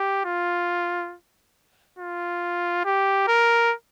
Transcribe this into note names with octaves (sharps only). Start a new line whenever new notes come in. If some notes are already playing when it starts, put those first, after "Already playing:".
Already playing: G4
F4
F4
G4
A#4